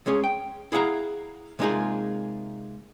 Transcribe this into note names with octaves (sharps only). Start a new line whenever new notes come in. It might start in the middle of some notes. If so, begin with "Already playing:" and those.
C#2 G#3 C#4 G#4
G5
E4 G#4 F5 F#5 A#5
C3 G#3 A#3 D#4 F4 G#4